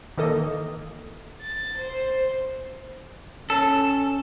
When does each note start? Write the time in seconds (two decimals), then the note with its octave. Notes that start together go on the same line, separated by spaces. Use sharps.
0.18 D#3 E3 A#3 A4 D#5
1.41 A6
1.78 C5
3.50 C#4 A4